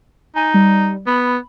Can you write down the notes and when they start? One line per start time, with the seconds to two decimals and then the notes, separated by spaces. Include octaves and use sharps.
0.36 D#4 G#5
0.54 G3
1.07 B3 B5